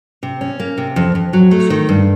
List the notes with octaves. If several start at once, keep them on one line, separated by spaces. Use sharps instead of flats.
C3
C#4
A#3
C3
F2
F2
F#3
A3
D#3
G2